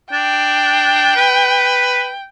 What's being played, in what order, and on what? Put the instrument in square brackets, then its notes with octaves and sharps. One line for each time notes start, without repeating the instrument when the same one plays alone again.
[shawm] D4 [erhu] G5
[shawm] B4